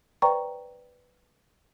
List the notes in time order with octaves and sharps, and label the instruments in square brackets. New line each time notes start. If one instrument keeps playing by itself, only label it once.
[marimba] B4 C5 D5 G5 A#5 C#6